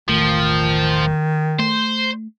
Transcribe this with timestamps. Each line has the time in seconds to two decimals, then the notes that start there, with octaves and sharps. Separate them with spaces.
0.08 E1 A1 D#3 F3 A3
1.59 A3 C5